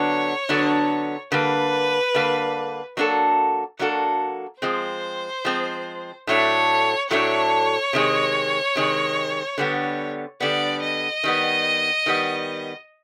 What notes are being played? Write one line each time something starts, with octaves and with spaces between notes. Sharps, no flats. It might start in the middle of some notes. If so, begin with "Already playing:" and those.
Already playing: D3 F#3 B3 D4 C#5
D3 F#3 B3 D4
D3 G3 A#3 B4
D3 G3 A#3
F#3 A#3 D4 F#4 A4
F#3 A#3 D4 F#4 A4
F3 G#3 C4 C5
F3 G#3 C4
A2 F#3 A3 D4 C#5
A2 F#3 A3 D4 C#5
C3 D#3 G#3
C3 D#3 G#3
D3 G3 B3
D3 G3 B3 D5
D#5
D#3 G3 B3
D#3 G3 B3